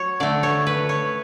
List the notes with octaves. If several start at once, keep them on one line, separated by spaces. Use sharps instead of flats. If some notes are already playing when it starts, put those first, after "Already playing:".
Already playing: F#3 C#5
D3 A3 D5
C#5
B4
C#5